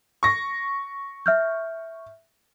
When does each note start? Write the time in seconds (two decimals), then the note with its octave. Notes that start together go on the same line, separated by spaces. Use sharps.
0.23 C#6 A#6
1.26 E5 F6 G6